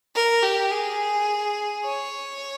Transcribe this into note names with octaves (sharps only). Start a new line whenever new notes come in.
A#4
G4
G#4
C#5